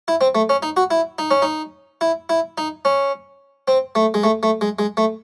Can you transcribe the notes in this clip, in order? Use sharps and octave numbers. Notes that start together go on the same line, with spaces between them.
E4
C4
A3
C#4
D#4
F#4
E4
D#4
C#4
D#4
E4
E4
D#4
C#4
C4
A3
G#3
A3
A3
G#3
G#3
A3